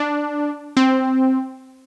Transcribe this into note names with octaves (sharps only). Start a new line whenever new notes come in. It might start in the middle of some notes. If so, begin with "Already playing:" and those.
Already playing: D4
C4